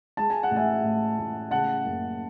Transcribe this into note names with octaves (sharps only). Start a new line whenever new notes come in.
G#3 A5
G#5
F#5
A1
E5 G#5
A2
A1
C#3 F#5 A5
F#1